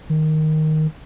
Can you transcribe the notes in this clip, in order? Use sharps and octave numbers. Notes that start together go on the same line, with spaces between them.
D#3